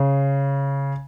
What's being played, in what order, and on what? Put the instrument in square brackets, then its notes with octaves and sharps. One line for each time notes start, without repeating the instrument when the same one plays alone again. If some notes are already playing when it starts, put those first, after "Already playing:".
Already playing: [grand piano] C#3